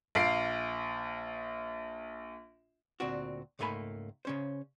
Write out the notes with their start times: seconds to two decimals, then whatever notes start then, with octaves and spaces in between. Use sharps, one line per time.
0.15 A#1 F5 C7 D7
3.00 D2 A#2 C4 F#4
3.59 C#2 G#2 A3 A#3 G#5 B5
4.25 C#3 C#4 C5